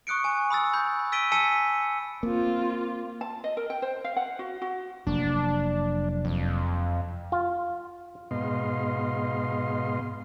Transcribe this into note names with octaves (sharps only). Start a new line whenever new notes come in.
C#6 D#6 F#6 C#7 D7
G#5
B5 D#6 E6 A6
B5 G6
E6 A6 B6 D7 D#7 G7
G#5 A5 E6 B6 C#7 D#7
A#3 C4 F4
A5
D#5
A#4
G5
C5
F5
F#5
F#4
F#4
F1 F#3 A#3 D4
F2
F4
G#2 B2 B3 D#5 F5 C6